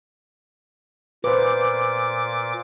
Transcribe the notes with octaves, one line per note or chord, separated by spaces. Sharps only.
A#2 B4 C5 D6